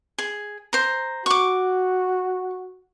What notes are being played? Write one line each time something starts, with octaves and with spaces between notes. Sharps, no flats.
G#4
C5 A#5
F#4 C#6 D6